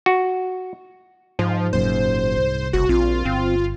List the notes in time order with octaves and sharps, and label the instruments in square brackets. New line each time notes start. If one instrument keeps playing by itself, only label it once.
[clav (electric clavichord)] F#4
[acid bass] G#2 [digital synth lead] F3
[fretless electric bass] F#1 F#2 A#2 [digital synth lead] C5
[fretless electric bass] C2
[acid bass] F#1 [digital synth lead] F#4
[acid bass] A#1 [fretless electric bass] C4 [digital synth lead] F4
[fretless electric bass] G1 [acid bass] C4